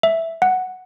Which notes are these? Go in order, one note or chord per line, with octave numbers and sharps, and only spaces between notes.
E5
F#5